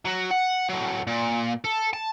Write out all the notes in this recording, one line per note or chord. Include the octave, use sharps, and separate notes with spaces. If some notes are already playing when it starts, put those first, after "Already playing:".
F#3 F#4
F#5
A2 F#3
A#2
A4
A5